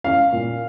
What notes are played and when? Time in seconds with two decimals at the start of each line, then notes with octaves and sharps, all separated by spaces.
0.04 C#4 F5
0.32 A#2